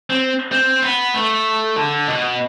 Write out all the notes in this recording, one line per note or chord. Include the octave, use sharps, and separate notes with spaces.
C4
C4
B3
A3
D3
B2